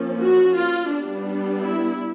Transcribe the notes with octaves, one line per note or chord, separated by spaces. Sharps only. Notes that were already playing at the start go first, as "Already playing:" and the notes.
Already playing: F3 A#3 C#4
F#4
F4
G3 B3 D4
E4